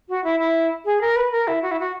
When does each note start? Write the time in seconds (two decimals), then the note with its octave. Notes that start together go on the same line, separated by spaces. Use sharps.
0.09 F#4
0.24 E4
0.40 E4
0.85 G#4
1.01 A#4
1.16 B4
1.32 A#4
1.48 E4
1.62 F#4
1.71 E4
1.80 F#4